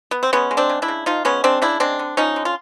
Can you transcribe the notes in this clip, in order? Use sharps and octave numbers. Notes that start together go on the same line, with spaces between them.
B3
C4
G#3 B3 C#4
G#3
C4 D4
C#3
D4 E4
C#3
F3 D#4 F4
G#3 B3 C#4
C#3 C4 D4
C#3 D4 E4
G#3 C4 D4
D3
F3 C#4 D#4
D3
F4